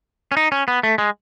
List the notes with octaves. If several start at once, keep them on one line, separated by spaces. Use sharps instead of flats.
C#4
D#4
C#4
B3
A3
G#3